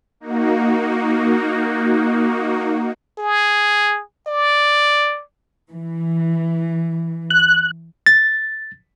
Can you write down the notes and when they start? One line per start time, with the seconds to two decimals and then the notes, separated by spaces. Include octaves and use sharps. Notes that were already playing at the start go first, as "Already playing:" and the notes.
0.20 A#3 D#4 F#4
3.19 G#4
4.27 D5
5.70 E3
7.31 F#6
8.06 A6